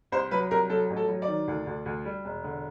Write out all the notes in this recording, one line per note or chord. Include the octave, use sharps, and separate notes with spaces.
C2 C5
F#3 B4
C2 A#4
F#3 A4
A1
A4
F#3
D5
D#3
D2
D2
D2
G3
E1
D3